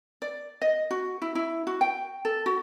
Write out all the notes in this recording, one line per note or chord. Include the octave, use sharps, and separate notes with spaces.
D5
D#5
F#4
E4
E4
F#4
G5
A4
F#4